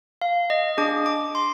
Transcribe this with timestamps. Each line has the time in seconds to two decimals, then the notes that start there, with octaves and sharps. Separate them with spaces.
0.22 F5
0.50 D#5
0.78 D4 G#4 D6
1.06 D6
1.35 C6